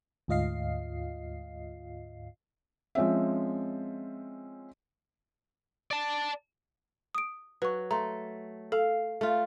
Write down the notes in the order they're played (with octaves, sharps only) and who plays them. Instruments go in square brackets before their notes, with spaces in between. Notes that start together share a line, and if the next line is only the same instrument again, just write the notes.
[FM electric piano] D2 G#2 F4 D#5 F5 C7
[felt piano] F3 G#3 C4 C#4 E5
[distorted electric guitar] D5 A5
[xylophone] D#6 D7
[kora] F#3 [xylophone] B4 C#6
[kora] A3 [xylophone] A#5 C6
[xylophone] A4 [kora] F5
[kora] A3 F4